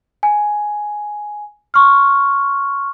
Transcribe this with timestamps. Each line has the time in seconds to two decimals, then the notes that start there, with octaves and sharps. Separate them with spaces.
0.23 G#5
1.74 C6 C#6 F6